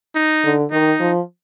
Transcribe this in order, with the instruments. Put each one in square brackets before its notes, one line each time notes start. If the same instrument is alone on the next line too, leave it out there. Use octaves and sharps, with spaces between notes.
[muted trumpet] D#4
[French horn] D3
[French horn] D#3 [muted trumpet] D#4
[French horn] F3